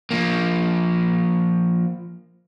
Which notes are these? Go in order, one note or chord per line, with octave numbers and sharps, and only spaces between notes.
F3 A#3